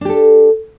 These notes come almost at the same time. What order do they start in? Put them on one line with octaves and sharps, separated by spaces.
D4 G4 A4